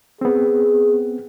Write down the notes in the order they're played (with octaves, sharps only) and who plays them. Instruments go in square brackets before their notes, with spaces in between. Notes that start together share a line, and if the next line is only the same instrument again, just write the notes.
[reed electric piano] B3 C4 [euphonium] G#4